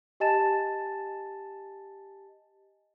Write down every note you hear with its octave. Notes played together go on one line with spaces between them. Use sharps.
G4 D#5 G#5 A5 A6 E7